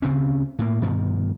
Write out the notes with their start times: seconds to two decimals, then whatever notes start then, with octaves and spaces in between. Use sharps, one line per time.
0.02 D2 C#3 C4 C#4
0.59 A2 A#3
0.82 G2 B2 D#3 F3